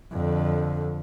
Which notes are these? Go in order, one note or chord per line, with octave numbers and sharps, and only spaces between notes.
F2 D3